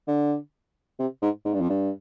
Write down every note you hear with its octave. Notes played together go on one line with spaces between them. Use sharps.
D3
C3
G#2
G#2
G2
F2
G2